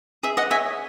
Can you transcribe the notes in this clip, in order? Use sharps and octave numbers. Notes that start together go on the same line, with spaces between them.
G#4 E5
D#5 F#5
C#5 E5 G#5